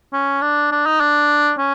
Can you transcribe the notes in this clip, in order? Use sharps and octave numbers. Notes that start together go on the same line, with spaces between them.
C#4
D4
D4
D#4
D4
C#4